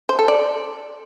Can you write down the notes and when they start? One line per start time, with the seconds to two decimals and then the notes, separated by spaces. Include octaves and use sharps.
0.09 C5
0.19 A4
0.28 D5